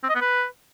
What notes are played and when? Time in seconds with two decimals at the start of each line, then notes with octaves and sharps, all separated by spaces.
0.03 C4
0.09 D#5
0.15 B3
0.21 B4